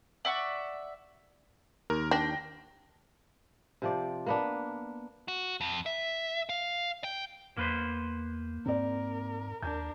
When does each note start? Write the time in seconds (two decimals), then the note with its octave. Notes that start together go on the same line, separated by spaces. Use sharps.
0.25 D5 E5 F#5 C#6
1.90 D#2 A#4
2.11 D4 G5 A#6
3.82 C3 F3 D5
4.26 A#3 B3 D4
5.28 F#4
5.61 F2
5.86 E5
6.49 F5
7.04 G5
7.57 E2 A#3 B4 C5
8.66 G#2 C4 A#4 D5
9.62 D#2 D4 A#4 G6